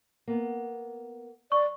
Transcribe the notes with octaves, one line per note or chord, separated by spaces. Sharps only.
A#3 B3
D5 C#6